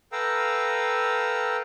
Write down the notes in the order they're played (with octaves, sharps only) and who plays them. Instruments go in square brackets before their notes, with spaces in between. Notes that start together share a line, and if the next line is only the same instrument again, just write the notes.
[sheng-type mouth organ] A4 B4 F5 G5 A#5 E6